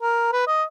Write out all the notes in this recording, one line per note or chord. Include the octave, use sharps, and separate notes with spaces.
A#4
B4
D#5